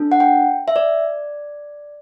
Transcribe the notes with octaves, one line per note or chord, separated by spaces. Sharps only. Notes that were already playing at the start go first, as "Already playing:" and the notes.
Already playing: D4 A4
F#5
G5
E5
D5